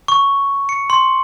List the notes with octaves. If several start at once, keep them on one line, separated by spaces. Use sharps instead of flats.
C#6
C#7
C6